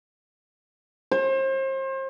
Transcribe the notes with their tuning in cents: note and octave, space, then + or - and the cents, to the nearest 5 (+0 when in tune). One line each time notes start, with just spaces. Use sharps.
C5 +35